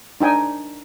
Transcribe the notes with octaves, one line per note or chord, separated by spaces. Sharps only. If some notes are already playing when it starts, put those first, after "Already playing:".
D4 D#4 G5 G#5